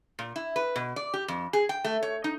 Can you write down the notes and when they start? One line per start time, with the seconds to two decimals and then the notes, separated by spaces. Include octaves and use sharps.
0.19 A#2
0.36 E4
0.56 B4
0.76 B2
0.96 D5
1.14 G4
1.28 F2
1.53 G#4
1.69 G5
1.84 A3
2.03 C#5
2.24 D#4